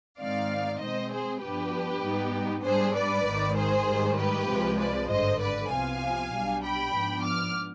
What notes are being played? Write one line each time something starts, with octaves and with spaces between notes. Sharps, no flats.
G#2 D#3 G#3 C4 D#4 D5 F5
B2 G#3 C4 C5 D#5
G#4 C5
G2 F3 B3 D4 G4 B4
G#2 G3 B3 D#4
G#2 G3 D4 G#4 C5
B4 D5
G#1 G#2 D#3
G#4 C5
G#2 D#3 G3
G4 B4
C2 C3 F3 G#3
B4 D5
G#1 G2 D3 C5 D#5
B4 D5
C2 C3 F3 B3 F5 G#5
B1 B2 G3 D4
G5 B5
G#2 F3 B3 D4
D6 F6